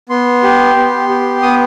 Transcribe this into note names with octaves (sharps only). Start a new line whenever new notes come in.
B3 C6
G4
B3
G4
B3 D#6